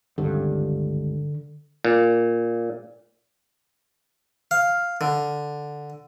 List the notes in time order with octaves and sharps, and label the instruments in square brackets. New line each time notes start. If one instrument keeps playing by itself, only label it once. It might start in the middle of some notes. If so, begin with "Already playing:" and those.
[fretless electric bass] G#1 C#2 G2 [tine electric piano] D3
[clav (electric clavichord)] A#2
[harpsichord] F5
D3